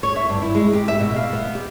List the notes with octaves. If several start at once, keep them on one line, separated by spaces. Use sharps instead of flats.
C#5
E5
G2
E4
G#3
G4
E5
B2
F5
B3
G4